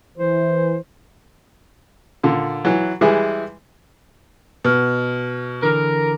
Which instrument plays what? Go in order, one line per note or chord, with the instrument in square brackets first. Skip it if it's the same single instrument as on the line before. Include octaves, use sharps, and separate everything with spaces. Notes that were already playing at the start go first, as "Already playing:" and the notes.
[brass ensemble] E3 [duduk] C5
[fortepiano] A#2 D3
E3 F#3
E3 G3 G#3 E4 G#4
[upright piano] B2 [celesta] B4 F6
[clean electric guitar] D3 E3 [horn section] A#4